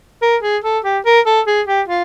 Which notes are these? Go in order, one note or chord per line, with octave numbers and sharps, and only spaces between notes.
A#4
G#4
A4
G4
A#4
A4
G#4
G4
F4